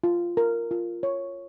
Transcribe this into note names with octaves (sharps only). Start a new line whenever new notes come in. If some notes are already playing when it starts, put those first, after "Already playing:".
F4
A#4
F4
C#5